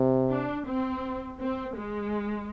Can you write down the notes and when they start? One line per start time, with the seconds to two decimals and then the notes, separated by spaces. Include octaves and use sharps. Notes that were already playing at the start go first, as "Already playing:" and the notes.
Already playing: C3
0.30 D4
0.67 C4
1.40 C4
1.75 G#3